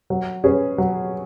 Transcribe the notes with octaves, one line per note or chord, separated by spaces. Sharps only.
F#3
C#4 G#4 B4
F#3